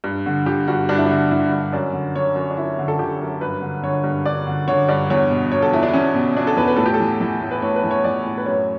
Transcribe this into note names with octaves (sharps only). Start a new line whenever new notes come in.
G2
D3
D3 G4
G2 F#4
G2 D4
E4
D3 D4
D3 E4
G2
F#2 D5
D3
D3 C#5
F#2
D4
F#2 E4
D3
A4
D3 G4
F#2
G2 B4
D3
D3 C#5
G2
G2 D5
D3
D3 C#5
G2 D5
E2 C#5
B2
B2 C#5
A4
E2 E4
D4
E2 C#4
B2
B2 D4
A4
E2 B4
B4
A2 A4
G4
A4
E3
E3
A2
B4
A2 C#5
B4
E3
C#5
E3 D5
A2
B4
F#2 C#5